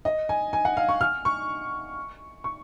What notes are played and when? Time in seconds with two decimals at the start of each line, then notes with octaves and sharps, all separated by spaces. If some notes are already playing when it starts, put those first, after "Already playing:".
0.05 D#5
0.29 G#5
0.53 G#5
0.65 F#5
0.77 F5
0.89 C#6
1.01 F6
1.25 C#6
2.44 C#6